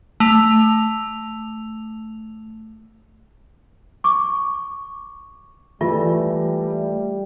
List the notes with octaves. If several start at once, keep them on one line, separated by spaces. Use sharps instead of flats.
A3 F7
C#6 D6
E3 G3 A3 F4